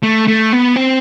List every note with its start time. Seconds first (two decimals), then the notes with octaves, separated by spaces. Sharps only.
0.03 A3
0.28 A3
0.53 B3
0.76 C4